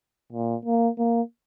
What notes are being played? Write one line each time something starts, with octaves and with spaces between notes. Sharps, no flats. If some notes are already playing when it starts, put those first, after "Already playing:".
A#2
A#3
A#3